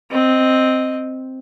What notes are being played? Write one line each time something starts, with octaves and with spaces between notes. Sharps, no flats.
C4 D#5